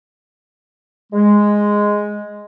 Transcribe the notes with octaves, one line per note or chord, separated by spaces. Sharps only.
G#3